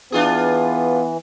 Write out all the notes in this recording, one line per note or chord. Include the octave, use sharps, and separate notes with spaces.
E3 B3 D4 F4 G#4